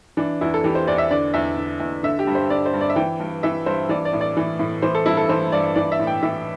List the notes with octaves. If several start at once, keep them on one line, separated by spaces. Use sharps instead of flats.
E3 D4
E2 E4
A4
E3 G4
C5
E2 D5
E5
D3 D5
E2 E5
D3
E2
D3 E5
G4
G2
C5
D3 D5
C5
G2
D5
E5
E3 G5
G2
E3 E5
G2 C5
E3 D5
D5
A2
D5
E3
A2
E3 C5
A4
G2 E4
A4
E3 C5
G2 D5
E3 D5
E5
A2
G5
E3 E5